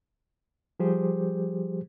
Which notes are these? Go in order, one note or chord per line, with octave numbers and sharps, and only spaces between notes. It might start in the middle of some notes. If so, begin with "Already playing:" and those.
F3 G3 G4 G#4 C5